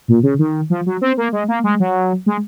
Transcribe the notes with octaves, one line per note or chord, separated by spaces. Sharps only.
A#2
C#3
D#3
F3
F#3
C4
A#3
G#3
A#3
G#3
F#3
G#3